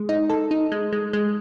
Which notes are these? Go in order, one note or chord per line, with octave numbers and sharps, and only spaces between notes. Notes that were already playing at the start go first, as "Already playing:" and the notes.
Already playing: G#3
D#4
A4
D#4
G#3
G#3
G#3